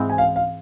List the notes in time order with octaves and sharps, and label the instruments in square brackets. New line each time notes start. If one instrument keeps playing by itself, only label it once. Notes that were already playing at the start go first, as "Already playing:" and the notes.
Already playing: [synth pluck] G#2 E3 G#3 C4
[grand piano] G#5
F5
F5